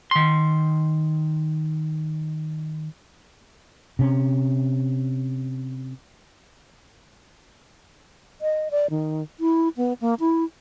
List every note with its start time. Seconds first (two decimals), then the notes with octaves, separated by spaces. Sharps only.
0.11 D#3 C6
3.99 C3 C#4
8.41 D#5
8.71 D5
8.90 D#3
9.40 E4
9.77 B3
10.01 A#3
10.20 E4